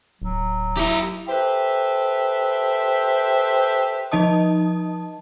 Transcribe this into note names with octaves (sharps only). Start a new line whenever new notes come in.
D1 F#3
E4 G4 A#4
G4 A4 B4 C5 E5
F3 D#4 D#5 A5 D#6